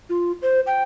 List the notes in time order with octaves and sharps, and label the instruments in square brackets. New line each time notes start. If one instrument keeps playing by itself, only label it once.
[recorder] F4
C5
G5